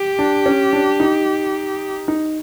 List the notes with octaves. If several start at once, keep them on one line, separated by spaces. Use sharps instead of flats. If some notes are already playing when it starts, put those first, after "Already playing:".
Already playing: G4
D4
C#4
D4
D#4
D#4